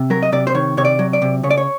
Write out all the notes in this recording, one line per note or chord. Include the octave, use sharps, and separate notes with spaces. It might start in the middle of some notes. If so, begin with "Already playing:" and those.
Already playing: C3
F#3 A#4
D#5
C3 D5
C5
D#3 C#5
C3 C#5
D5
F#3
D5
C3
C#3 C#5
D5
C#5